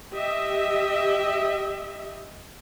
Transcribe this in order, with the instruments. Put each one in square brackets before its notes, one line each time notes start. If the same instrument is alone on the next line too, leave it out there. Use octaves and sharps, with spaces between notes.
[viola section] G4 D#5 E5